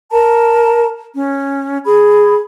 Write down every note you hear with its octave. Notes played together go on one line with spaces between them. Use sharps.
A#4 A5 A#5
C#4
G#4 B5